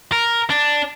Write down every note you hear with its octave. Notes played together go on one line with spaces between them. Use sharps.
A#4
D4